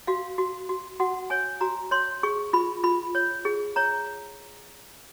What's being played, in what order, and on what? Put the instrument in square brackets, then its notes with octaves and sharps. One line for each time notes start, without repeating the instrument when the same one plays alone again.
[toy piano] F#4 F5
F#4
F#4
F#4 F#5
C#5 G#5
F#4 A#5
C#5 C6
G#4 C#6
F4 B5
F4 B5
C#5
G#4
C#5 A#5